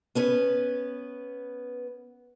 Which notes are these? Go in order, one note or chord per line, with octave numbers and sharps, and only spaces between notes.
B3 C#4 B4